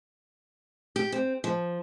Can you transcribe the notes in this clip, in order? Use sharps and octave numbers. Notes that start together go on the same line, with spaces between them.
G4
C4
F3